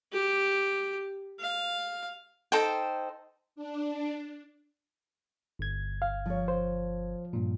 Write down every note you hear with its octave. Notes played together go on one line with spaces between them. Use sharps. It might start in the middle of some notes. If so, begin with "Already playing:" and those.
G4
F5
D#4 A4 C5 G5
D4
G1 G#6
F5
F3 C#5
C5
G2 A#2